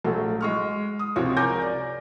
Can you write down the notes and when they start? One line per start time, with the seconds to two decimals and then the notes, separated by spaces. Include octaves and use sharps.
0.04 A#1 F#3 A3
0.41 G#3 C#6 F6
0.99 D#6
1.16 C#2 C3 F3 F4 F#4 C#5
1.37 A#4 C#5 G#5 D6 G6 A#6
1.61 D5